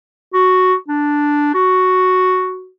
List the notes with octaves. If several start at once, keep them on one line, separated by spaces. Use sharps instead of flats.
F#4
D4
F#4